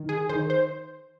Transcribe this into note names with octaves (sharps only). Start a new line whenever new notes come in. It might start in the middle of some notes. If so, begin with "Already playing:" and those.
Already playing: D#3
G#4
D#3 C5
C5